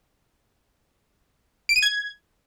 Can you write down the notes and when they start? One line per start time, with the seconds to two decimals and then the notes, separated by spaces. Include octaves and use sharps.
1.69 D7
1.76 D#7
1.83 G#6